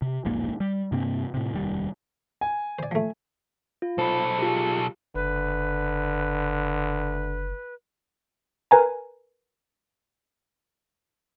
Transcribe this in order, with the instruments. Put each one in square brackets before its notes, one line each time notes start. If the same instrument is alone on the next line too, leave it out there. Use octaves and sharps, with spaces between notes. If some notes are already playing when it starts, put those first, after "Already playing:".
[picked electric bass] C3
E1 A#1 G#2 A#3
G3
G2 C3 A#3 C4
A2 C3
F1 D#2 C3 G3
[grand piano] G#5
[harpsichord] C5 D5
F3 A3
[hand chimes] F4
[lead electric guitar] B1 A4 [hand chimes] C5 B5
[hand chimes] F4 G4 G#4
[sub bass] F#1 [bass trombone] D3 [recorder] B4
[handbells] A#4 B4 G#5 A#5